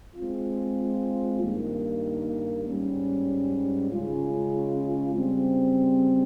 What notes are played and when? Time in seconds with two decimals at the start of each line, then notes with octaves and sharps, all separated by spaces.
0.15 G#3 C4 F4
1.40 G2 D#3 A#3
2.65 G#2 G3 C#4
3.90 C#3 G#3 C#4 F4
5.14 C#3 G3 C4